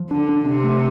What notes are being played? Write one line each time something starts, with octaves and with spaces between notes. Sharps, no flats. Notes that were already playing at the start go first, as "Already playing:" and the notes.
Already playing: F3
D3 D4
D4
C3 D4
A3